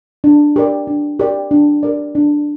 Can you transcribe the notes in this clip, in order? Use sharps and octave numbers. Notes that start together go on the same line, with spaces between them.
D4
G4 A#4 D5
D4
G4 A#4 D5
D4
G4 A#4 D5
D4